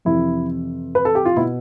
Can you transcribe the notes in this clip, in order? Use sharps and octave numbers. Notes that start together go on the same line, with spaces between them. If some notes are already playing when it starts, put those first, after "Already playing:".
F2 C3 E3 E4
B4
A4
G4
F4
B2 E4